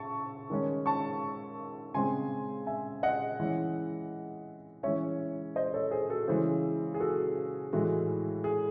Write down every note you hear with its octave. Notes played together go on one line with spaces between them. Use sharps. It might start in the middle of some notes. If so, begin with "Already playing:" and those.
Already playing: C#3 A5 C#6
D#3 G#3 C#4
A5 C#6
C#3 G#3 C4 G#5 C6
E5 G#5
D#5 F#5
E3 G#3 C#4
E3 G#3 C#4 C#5 E5
C5 D#5
A4 C#5
G#4 C5
F#4 A4
C#3 E3 G#3 C#4 G#4 C5
G#4
F#4 A4
A2 E3 G#3 F#4
G#4